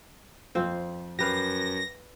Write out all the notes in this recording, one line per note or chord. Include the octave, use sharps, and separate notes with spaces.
F2 C4 F4 C5
F#2 G4 B4 F5 A#6